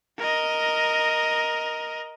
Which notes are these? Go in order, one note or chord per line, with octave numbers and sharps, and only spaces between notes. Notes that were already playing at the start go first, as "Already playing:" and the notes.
A#4 D#5